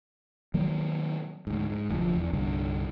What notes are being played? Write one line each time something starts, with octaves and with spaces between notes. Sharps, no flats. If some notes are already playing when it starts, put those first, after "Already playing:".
D#3 F#3 A#3
D2 G#2
G#2
F1 D2 F3
E2
C2 G2 D3